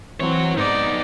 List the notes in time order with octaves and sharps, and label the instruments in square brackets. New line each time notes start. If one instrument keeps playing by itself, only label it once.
[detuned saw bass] E3 [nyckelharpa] C4 [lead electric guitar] F#4 C#5
[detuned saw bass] G#2 [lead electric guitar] B3 D#4 [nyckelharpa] D5